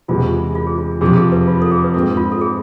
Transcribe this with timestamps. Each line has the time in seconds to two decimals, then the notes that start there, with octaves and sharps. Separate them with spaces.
0.08 E2 C3 G#3 F4
0.55 F4
0.67 G#4
0.78 F4
1.01 F2 C3 F3 G#4
1.17 G#4
1.32 B4
1.48 F4
1.62 A4
1.72 G#4
1.84 B4
1.94 G#2 G#3 C4 A4
2.17 F4
2.32 A4
2.41 G#4